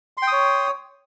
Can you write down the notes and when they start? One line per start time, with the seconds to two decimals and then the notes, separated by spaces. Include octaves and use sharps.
0.17 C6
0.22 G5
0.27 D#6
0.32 C#5